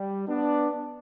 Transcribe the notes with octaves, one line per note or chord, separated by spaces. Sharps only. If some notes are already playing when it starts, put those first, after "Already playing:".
Already playing: G3
B3 D4